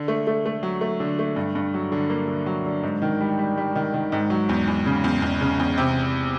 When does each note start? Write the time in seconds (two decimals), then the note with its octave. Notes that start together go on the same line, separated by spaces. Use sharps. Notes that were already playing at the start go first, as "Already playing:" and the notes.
Already playing: D3
0.08 A3
0.27 A3
0.46 A3
0.63 F#3
0.81 A3
1.00 D3
1.19 A3
1.36 G2
1.55 G2
1.74 F#3
1.92 D3
2.10 A#3
2.28 D3
2.46 F#3
2.66 D3
2.83 G#2
3.02 D#3
3.21 G3
3.39 G3
3.57 G3
3.75 D#3
3.94 D#3
4.12 G#2
4.30 F#3
4.49 E2
4.67 E2
4.86 C#3
5.04 E2
5.22 E2
5.41 C#3
5.59 E2
5.78 C3